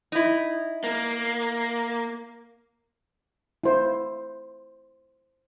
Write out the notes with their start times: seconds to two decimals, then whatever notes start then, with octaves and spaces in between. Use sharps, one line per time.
0.12 D#4 E4
0.84 A#3
3.64 E4 C5